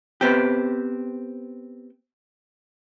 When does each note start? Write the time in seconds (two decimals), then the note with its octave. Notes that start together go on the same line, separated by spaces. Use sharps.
0.21 B3 C4 G4